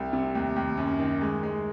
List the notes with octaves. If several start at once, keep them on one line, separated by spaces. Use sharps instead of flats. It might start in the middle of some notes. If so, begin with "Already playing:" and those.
Already playing: C2
C3
D#2
D#2
F#2
D#3
G#3
G#3